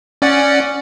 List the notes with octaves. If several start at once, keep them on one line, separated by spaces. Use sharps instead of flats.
C#4 D5 F#5